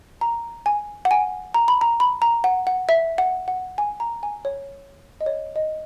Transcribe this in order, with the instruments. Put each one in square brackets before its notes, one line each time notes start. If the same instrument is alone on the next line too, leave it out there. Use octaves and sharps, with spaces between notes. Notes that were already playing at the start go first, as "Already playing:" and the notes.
[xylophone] A#5
G#5
F#5
G#5
A#5
B5
A#5
B5
A#5
F#5
F#5
E5
F#5
F#5
G#5
A#5
G#5
C#5
D#5
C#5
D#5